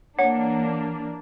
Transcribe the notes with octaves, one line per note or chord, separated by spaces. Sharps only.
E3 A#3 D4 C#5 F#5